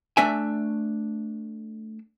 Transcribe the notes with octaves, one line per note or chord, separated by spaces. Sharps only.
A3 D4 E5 G#5